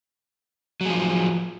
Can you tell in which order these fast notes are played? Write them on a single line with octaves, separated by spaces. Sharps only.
F#3 G#4 F3